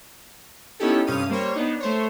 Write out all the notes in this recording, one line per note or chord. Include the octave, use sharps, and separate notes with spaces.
B3 C#4 D#4 E4 G4 A4
G2 C3 C#4 F5 D#6 D#7
G3 A#3 C5 C#5
B3 D4 D#4
A3 C5 C#5